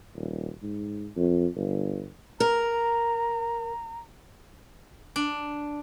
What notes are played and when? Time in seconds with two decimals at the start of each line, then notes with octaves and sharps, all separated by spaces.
0.15 D#1
0.62 G#2
1.16 F2
1.56 G1
2.40 A#4 A#5
5.16 D4